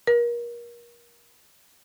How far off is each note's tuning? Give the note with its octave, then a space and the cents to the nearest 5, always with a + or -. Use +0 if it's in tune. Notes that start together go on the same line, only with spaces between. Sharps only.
A#4 +30